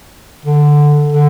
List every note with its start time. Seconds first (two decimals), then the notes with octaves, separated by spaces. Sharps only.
0.45 D3
1.12 D3